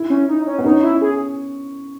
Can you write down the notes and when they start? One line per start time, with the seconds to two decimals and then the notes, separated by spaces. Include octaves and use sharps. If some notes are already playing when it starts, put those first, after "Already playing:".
Already playing: E4
0.10 C#4
0.28 D#4
0.47 C#4
0.59 B3
0.64 C#4 D#4
0.83 E4
1.02 G#4